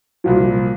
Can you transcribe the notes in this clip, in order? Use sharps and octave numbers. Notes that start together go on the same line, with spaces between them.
C2 A#2 F3